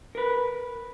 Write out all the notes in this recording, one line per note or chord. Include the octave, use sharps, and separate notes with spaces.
A#4 B4